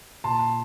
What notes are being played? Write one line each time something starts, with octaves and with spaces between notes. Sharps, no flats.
A#2 A5 C6